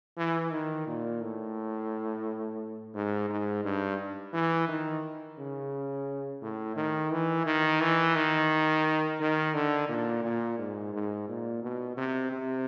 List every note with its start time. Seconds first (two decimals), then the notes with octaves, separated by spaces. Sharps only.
0.17 E3
0.51 D#3
0.87 A#2
1.21 A2
2.95 G#2
3.29 G#2
3.64 G2
4.33 E3
4.68 D#3
5.38 C#3
6.42 A2
6.76 D#3
7.11 E3
7.46 D#3
7.81 E3
8.15 D#3
9.20 D#3
9.54 D3
9.89 A#2
10.23 A#2
10.58 G#2
10.93 G#2
11.28 A#2
11.62 B2
11.97 C3
12.32 C3